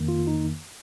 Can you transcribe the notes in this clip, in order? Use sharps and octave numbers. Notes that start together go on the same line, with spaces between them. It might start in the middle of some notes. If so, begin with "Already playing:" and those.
Already playing: F2 D#3 A#3
F4
D#4